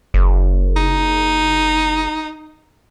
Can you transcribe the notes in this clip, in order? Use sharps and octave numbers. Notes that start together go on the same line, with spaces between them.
F#1
D#4